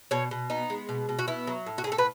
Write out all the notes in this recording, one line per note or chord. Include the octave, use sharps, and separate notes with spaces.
B2 C#5
B2
B3 D#4
G#3
B2
B2
F#4
B3 E4
F#3
A2
F#4
G#4
A2
A4
B4